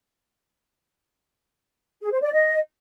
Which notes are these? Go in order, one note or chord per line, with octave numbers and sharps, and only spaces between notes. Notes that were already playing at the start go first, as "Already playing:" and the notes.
G#4
C5
D5
D#5